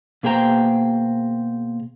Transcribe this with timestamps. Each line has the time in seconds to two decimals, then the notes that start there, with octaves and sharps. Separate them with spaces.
0.23 B2 A#3 G#4 C5 G5 A#5